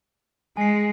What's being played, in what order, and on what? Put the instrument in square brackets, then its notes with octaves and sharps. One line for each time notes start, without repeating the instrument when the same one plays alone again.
[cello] G#3 [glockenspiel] G#5 C7